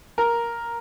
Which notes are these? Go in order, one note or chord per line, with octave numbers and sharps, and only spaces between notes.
A#4